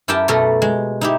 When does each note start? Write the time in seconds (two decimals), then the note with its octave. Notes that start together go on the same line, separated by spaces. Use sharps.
0.08 F#2 E4 G4 A#4 G5 A5
0.28 B2 A3 A4 A#4
0.62 G#3
1.01 D#4 E4 G4